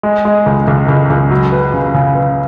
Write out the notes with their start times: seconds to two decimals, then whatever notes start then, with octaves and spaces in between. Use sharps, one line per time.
0.03 G#3
0.25 G#3
0.46 C#2
0.68 C#2
0.88 C#2
1.10 C#2
1.30 F#3
1.52 B4
1.74 C#3
1.94 C#3
2.15 B4